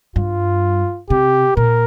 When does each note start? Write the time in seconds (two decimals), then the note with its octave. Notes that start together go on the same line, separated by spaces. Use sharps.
0.16 G2 F4
1.10 C3 G4
1.57 A#2 A#4